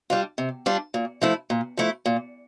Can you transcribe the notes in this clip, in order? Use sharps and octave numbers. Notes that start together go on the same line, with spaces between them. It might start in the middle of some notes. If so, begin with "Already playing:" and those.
G3 D4 F4
C3
G3 D4 F4
A#2
F3 A3 E4
A#2
F3 A3 E4
A#2